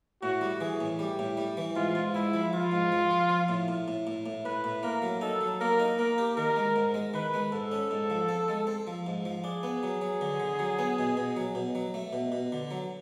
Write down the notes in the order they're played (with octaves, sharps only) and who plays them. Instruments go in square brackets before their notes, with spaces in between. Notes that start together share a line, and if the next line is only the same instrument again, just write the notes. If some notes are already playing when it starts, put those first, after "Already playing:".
[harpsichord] A2 [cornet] F#4
[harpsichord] G3
[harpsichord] E3 [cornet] G#4
[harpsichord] A2
[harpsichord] G3 [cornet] G4
[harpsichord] A2
G3
E3
[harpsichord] G#2 [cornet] F4
[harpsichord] G#2
[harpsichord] G#3 [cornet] E4
[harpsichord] F3
[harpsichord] F3 [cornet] F4
[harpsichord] G#2
F3
F3
F3
A2
A2
A2
A2
A2
[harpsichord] A2 [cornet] B4
[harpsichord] A2
[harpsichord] A#3 [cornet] A#4
[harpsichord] F#3
[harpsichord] D#4 [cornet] A4
[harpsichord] F#3
[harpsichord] A#3 [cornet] A#4
[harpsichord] D#4
[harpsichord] A#3 [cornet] A#4
[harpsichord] G4
[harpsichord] D#3 [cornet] A#4
[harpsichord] G#3
G#2
G#3
[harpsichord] D#3 [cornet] B4
[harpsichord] G#3
[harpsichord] G#2 [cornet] A4
[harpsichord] C#4
G#2
F3
C4
G#3
C4
F3
G#2
F3
[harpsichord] D4 [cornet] G#4
[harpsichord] B3
F#3
F#3
D3
D3
F#3
B3
B2
B2
F#3
B2
F#3
A3
B2
B2
D3
F#3